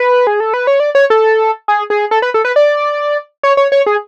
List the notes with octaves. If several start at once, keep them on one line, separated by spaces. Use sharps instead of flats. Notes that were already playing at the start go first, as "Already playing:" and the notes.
Already playing: B4
G#4
A4
B4
C#5
D5
C#5
A4
G#4
G#4
A4
B4
A4
B4
D5
C#5
C#5
C#5
G#4